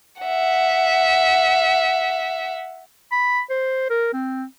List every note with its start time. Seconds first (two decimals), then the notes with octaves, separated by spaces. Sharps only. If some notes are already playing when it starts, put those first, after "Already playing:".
0.22 E5 F#5
3.12 B5
3.50 C5
3.90 A#4
4.13 C4